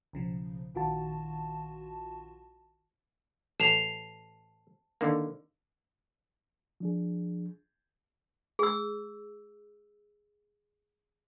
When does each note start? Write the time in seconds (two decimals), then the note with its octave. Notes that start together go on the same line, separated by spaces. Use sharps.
0.13 B1 C#3 F3
0.75 A#1 D#3 F4 F#4 A5
3.60 A1 A5 C7 F7
5.01 D3 D#3 A#3
6.80 F3 D4 G#4
8.59 G#4 E6